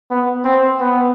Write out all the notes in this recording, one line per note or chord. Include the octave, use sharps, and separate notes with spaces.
B3
C4
B3